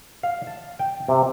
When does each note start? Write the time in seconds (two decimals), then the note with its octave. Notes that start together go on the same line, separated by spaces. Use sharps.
0.23 F5
0.47 A5
0.79 G5
1.08 C3